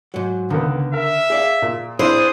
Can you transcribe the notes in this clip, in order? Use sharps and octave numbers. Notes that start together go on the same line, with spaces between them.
G#2 F#3
C#2 D3 D#3 B3
A#4 E5
G#4 D5 F5
A#2
C4 D4 E4 G#4 C5 D#6